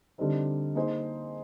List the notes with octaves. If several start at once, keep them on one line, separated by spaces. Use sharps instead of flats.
D3 G3 C4 D#4
A#3 D#4 G#4 C5